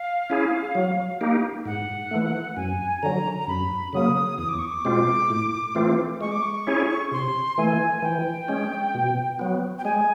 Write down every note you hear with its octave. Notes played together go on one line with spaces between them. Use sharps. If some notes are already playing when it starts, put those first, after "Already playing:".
Already playing: F5
C#4 E4 G#4
F#3
A#3 D#4 G4
G#2 F#5
E3 A3
F#2 G#5
D3 F#3 A#5
A#5
F#2 B5
C#3 F#3 A#3 D#6
E2 D#6
D6
C#6
D6
B2 G#3 C4 F4
A2
E3 A3 C4 F4
G#3 C#6
D6
C#6
C#4 E4 G#4 C#5
C3 C6
E3 A3 G#5
E3 G5
G#3 C#4
B2
F#3 B3
G5
G#3 G#5